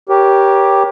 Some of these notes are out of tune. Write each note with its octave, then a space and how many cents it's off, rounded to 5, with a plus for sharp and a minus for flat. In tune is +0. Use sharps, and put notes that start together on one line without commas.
G4 +0 A#4 +25 C#5 +0